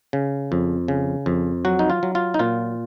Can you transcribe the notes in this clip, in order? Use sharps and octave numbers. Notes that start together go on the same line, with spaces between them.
C#3
F2
C#3
F2
F#3 F#4
D#4
F4
F#3
F4
D#4
A#2 F4